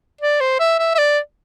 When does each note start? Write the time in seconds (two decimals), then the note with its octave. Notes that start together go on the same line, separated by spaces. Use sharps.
0.21 D5
0.41 C5
0.60 E5
0.79 E5
0.95 E5
0.98 D5